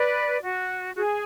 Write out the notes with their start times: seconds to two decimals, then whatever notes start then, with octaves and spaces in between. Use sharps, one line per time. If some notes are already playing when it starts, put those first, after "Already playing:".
Already playing: B4 D5
0.43 F#4
0.95 F#4
0.98 G#4